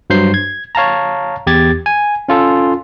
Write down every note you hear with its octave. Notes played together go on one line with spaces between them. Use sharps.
G2 F#3 C5 G6 C7
G#6
C#5 F5 A5 A#5
E2 G4 G#6 A6
G#5
C#4 F4 A4